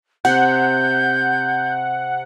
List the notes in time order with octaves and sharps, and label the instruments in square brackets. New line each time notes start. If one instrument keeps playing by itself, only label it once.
[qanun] C3 [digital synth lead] F#5 [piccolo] G6